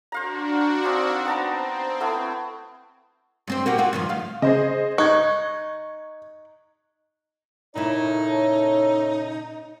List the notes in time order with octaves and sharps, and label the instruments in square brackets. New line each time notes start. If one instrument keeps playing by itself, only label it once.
[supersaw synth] D4 F#4 [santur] C5 F5 A#5
[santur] A#3 C4 D#4
[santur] B3 A5 A#5 [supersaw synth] C4
[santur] A3 B3 E4
[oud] G2 C4 C5
A#3 F#4 G4
C4 F4 F#4
G2 D#3 F3
D2 F5
[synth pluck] C#3 [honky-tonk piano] G#4 C5 D#5
[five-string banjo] D#4 [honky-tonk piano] C#6 F#6 G#6
[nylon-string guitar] A#2 C#3 E4 [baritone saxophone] D#4 [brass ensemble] A4 C#5